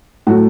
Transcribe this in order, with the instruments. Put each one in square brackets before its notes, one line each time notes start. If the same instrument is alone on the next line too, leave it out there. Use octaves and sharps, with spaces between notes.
[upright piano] A2 F#3 A3 F#4